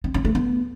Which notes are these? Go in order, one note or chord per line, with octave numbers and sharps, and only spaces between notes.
C4
C#4
A3
B3